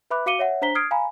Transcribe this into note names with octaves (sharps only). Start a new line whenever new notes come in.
B4 E5 B5 D6 F#6
F#4 F5 D6 C#7 D#7 G7
C#5 E5 F#5
D4 C5 A#5 B6 G7
D#6 F6 G#6 C7 D7
F5 G#5 A#5 B5